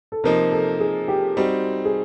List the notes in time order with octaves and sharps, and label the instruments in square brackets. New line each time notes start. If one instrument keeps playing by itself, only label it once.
[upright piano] A4
[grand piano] C3 F3 A#3 D#4 [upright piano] A#4
[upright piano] A4
G#4
G4
[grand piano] G3 C4 D#4 [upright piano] F#4
[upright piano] G#4